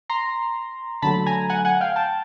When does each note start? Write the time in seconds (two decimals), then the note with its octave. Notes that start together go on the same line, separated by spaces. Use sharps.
0.10 A#5 C6
1.02 D3 F#3 A3 A5 B5
1.26 G#5 A#5
1.49 F#5 G#5
1.65 F#5 G#5
1.81 F5 G5
1.96 G5 A5